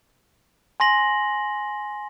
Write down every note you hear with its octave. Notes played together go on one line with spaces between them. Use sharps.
G#5 C6 A#6 F#7